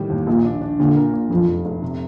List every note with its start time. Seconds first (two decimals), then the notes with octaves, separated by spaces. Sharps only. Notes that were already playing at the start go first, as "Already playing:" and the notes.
Already playing: A2 D#3 G3
0.10 D#2
0.27 A#1 A#2
0.45 D4
0.61 D4
0.79 A#2 D3
0.96 A#4
1.14 A#2
1.31 F2 F3
1.48 F1
1.65 F1
1.82 C3